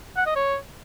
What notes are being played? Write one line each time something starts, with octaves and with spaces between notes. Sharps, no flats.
F#5
D#5
C#5